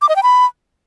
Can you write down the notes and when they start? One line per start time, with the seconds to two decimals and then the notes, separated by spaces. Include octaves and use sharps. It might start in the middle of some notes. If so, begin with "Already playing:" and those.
0.02 D6
0.09 D#5
0.16 G5
0.23 B5